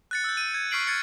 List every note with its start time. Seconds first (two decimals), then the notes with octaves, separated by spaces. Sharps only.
0.11 F#6 A6 C#7
0.24 E6 G6
0.37 D#7
0.54 G#6
0.71 C#6 F6 B6 C7 D7 F#7
0.87 F6 G#6 A6 C#7